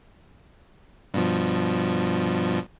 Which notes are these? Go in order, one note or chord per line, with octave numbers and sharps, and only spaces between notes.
G2 B2 F3